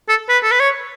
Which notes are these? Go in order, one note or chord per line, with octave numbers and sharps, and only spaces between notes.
A4
B4
A4
B4
C#5